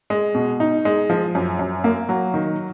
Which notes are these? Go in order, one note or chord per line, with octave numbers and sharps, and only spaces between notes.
G#3
B2
D#4
G#3
F3
F#2
F#2
A#3
F#3
D#3